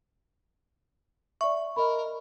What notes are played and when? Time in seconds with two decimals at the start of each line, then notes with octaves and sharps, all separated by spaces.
1.41 D5 E5 C#6
1.76 A#4 D#5 B5